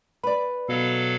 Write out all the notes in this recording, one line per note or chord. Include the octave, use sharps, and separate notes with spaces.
B4 D5 B5
B2 F#3 A4 F5